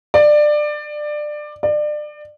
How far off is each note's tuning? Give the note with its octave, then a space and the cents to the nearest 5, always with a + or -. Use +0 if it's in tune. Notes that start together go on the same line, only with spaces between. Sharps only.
D5 +20
D5 +30